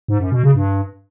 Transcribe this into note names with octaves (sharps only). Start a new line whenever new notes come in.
G#2
F#2
B2
C#3
G2